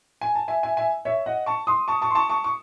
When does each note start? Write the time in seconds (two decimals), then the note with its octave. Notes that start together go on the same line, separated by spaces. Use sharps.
0.21 G#5
0.35 A5
0.48 E5 G#5
0.63 E5 G#5
0.77 E5 G#5
1.05 C#5 E5
1.26 D#5 F#5
1.46 A5 C#6
1.67 C6 D#6
1.88 A5 C#6
2.02 A5 C#6
2.11 C6
2.15 A5 C#6
2.30 A5 C#6
2.44 C#6